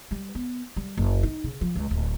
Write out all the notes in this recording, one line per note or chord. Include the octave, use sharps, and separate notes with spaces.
G3
B3
G3
F#1
D#4
C#3
F3
C#2
D1